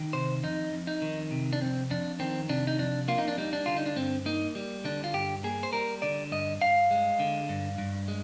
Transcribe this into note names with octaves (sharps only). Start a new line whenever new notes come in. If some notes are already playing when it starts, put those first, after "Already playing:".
Already playing: D#3
C3 C5
F2 D#4
F2
D#4
D#3
C3
D4
F2 C4
F2 D4
D#3 C4
C3 D4
D#4
F2 D4
A#3 F4
D#4
D4
G3 D#4
D4
D3 F4
D#4
D4
G2 C4
A#3 D#4
G3
D3 D4
F4
G2 G4
A#3 G#4
C5
G3 A#4
D3 D5
G2 D#5
G2 F5
G#3
D3
G2
G2
G#3